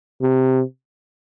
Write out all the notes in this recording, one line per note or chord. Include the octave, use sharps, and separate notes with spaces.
C3